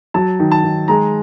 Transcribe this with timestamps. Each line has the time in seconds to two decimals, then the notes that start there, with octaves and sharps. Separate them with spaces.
0.14 F#3 A5
0.39 D#3
0.51 A5
0.64 D#3
0.88 G#3 A#5